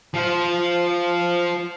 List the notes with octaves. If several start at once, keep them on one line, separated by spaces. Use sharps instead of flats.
F3 C5